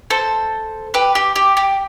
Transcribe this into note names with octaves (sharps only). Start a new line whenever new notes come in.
A4 C5
G4 B4
G4
G4
G4